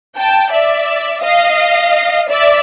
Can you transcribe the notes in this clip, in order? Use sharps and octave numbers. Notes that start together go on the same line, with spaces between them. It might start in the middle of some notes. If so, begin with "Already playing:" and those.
G5 A5
D5 E5
D#5 F5
D5 E5